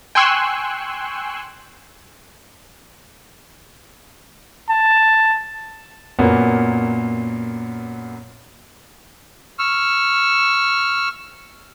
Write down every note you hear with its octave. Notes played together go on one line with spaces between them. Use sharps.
G5 G#5 C6 C#6 E6 F#6
A5
F#2 A#2 A#3 B3
C#6 E6 F6